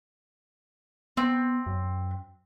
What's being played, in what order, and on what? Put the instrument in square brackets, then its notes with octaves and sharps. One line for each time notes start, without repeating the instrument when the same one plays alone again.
[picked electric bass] B3 [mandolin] C4
[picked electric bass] F#2